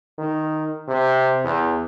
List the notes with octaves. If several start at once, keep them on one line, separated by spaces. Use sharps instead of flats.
D#3
C3
E2